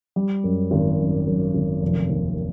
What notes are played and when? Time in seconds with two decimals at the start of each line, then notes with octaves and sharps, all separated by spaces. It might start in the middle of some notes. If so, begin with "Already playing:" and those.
0.16 G3
0.44 F#2
0.71 G#1
0.99 F#2
1.27 F#2
1.54 G#1
1.83 F1
2.10 D#2